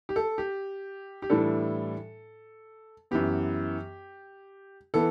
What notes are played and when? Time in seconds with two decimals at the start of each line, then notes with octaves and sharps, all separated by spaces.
0.09 G4
0.16 A4
0.38 G4
1.22 G4
1.30 A2 E3 G3 D4 A4
3.11 F#2 E3 B3 G4
4.94 E3 B3 A4